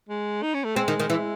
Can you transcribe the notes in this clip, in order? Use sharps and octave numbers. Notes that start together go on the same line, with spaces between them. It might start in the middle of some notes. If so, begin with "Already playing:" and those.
G#3
D#4
C#4
A3
G#3 C4
D#3
D#3
E3